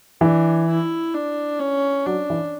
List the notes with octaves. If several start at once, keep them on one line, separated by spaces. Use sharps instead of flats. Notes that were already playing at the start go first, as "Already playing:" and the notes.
E3 D4
E4
D4
C#4
F#3 D4
E3